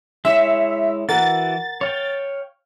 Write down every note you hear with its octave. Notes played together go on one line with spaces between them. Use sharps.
G#3 E4 C#5 E5
E3 F#4 A#4 F#5 A6
C#5 F5 G5